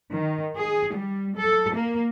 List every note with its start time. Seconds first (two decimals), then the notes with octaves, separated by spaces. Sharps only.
0.11 D#3
0.56 G#4
0.93 G3
1.37 A4
1.72 A#3